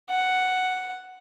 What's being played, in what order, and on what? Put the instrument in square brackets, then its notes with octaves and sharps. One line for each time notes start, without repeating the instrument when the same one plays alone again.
[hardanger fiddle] F#5